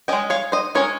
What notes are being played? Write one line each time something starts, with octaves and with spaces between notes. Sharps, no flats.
G#3 C#4 D#5 G5
C#5 F5
C5 D#5
G#3 C#4 A#4 C#5